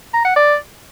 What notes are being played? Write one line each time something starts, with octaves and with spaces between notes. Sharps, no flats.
A#5
F#5
D5